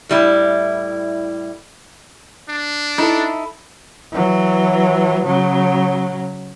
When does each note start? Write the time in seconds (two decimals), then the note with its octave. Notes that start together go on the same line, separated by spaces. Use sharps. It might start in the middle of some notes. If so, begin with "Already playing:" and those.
0.09 A2 G3 E4
2.49 D4
2.98 D#4 E4 A4
4.12 E3 F#3
5.25 C#3 F#3